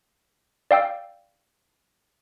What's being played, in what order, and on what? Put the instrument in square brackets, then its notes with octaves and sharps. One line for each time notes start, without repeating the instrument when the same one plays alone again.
[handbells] D5 F5 G5 E6